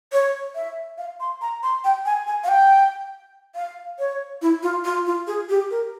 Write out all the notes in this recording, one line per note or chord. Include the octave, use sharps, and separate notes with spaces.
C#5
E5
F5
C6
A#5
C6
G5
G#5
G#5
F5
G5
F5
C#5
E4
F4
F4
F4
G#4
G4
A#4